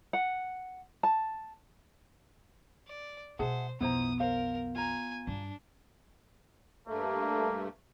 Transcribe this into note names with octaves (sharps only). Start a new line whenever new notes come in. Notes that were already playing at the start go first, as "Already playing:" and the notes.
F#5
A5
D5
B2 G#3 G#4 C5 E5 F#5 A5
B1 F2 B3 E4 C5 A#5 D#6
A#4 C5 F5
F4 G#5 A#5
G2 D4
G2 A3 A#3